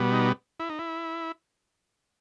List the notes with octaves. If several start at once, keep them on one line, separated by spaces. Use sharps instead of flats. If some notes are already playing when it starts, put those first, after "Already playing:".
Already playing: B2 G3 B3
D#4
E4
D#4
E4